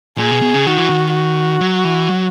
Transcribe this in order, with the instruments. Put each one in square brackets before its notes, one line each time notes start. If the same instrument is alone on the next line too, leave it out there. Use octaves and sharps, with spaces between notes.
[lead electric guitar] A#2 [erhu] G#4
[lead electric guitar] B2
B2
C#3
[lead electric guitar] D#3 [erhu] F#4
[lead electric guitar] E3
D#3
[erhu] F#4
[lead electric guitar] F#3
E3
F#3